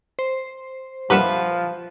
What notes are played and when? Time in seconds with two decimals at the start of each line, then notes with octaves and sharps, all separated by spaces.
0.19 C5
1.10 G2 F3 A#3 B4 E5 F#5